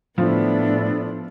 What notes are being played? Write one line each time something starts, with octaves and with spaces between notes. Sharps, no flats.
A2 F3 B3 D4 E4 A4